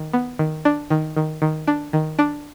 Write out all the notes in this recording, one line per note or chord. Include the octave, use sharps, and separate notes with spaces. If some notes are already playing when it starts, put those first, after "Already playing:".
Already playing: D#3
B3
D#3
D4
D#3
D#3
D#3
D4
D#3
D4